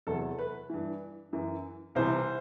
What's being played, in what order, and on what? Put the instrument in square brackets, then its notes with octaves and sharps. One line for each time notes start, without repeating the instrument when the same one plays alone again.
[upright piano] E2 C3 F#3 A4
B4
G2 E3
F#2 E3
C2 C3 E3 C5